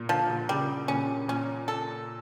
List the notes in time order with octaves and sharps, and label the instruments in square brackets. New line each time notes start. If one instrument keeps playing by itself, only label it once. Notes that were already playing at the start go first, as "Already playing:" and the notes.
Already playing: [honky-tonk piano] A#2
[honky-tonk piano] D3 [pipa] F3
[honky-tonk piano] A#2
[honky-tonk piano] C#3 [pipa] G3
[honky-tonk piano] A#2 [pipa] C#4
[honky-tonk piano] A#2 [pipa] C#4
[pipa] A4